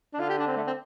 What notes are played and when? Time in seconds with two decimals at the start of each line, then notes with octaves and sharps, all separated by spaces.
0.13 D4
0.19 D3 F4
0.29 G4
0.38 D4
0.47 C4
0.57 A3
0.67 C4